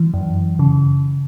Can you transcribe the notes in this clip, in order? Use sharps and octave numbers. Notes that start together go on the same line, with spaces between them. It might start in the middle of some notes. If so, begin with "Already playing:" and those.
Already playing: E3
F#2
C#3